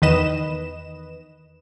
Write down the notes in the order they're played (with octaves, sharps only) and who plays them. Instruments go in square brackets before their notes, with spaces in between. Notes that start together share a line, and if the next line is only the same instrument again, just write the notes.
[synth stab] E2 D#3 B4 D#5 E7